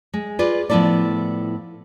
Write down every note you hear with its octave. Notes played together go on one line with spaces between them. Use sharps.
G#3
F4 G#4 B4 D5
A2 F3 B3 E4 A4 D5